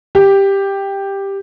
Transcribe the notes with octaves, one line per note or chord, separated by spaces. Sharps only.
G4